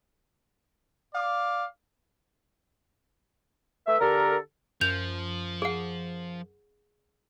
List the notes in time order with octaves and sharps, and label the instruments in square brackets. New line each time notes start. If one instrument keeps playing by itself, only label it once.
[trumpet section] D5 F5 D6
[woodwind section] A3 B4 E5
D3 G4 A4 A#4
[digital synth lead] F#2 [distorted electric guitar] F3 [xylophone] G6 F7
[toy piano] G#4 F#5